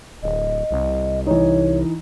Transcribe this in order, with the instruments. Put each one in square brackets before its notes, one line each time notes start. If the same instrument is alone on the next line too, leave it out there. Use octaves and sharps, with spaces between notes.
[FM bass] D1 [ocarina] D#5
[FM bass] C2
[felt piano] E3 D#4 [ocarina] C#5